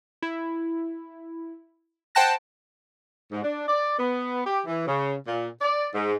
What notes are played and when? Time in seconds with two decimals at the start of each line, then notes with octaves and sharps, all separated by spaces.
0.22 E4
2.15 C5 F#5 G5 A5 F#6 A#6
3.31 G#2
3.43 D4
3.68 D5
3.98 B3
4.46 G4
4.66 E3
4.86 C#3
5.28 A#2
5.61 D5
5.94 G#2